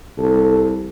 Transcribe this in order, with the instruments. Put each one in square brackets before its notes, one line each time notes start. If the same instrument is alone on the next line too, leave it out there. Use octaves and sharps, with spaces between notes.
[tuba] C2 [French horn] A4